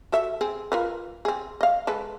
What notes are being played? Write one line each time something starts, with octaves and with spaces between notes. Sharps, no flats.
F#4 A4 E5
C4 G#4
F4 A#4 B4
C4 G#4
D#5 F5
G#3 A4 B4